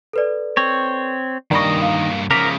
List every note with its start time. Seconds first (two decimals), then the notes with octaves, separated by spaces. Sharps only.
0.13 A4 B4 D5
0.57 C4 C#5
1.51 G2 D#3 A#3 D5 D#5 B5 C#6
1.82 F5
2.31 C#3 F3 A#4 D6 A#6 B6